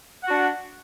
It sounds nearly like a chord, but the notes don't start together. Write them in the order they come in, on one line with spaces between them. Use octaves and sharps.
F#5 F#4 D4